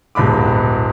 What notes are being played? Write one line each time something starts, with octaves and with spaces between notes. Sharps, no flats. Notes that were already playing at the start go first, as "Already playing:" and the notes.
D#1 B1 G#2 B5 D6